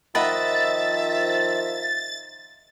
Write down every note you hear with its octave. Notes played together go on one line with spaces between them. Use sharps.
D#3 F3 D#5 E5 F#5 B5 A6